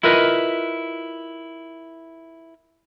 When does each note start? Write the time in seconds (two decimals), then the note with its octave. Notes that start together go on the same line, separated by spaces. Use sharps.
0.03 E4 F4 A#4 B4 D#5